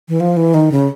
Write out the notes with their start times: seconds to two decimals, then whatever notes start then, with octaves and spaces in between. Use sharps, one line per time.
0.09 E3
0.20 F3
0.37 E3
0.54 D#3
0.72 C#3